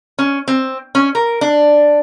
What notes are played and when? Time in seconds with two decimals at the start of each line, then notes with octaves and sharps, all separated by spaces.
0.19 C#4
0.48 C4
0.95 C#4
1.15 A#4
1.41 D4